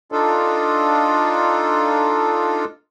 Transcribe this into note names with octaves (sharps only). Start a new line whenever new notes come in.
D4 D#4 F4 A4